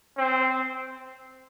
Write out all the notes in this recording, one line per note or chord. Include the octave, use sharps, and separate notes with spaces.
C4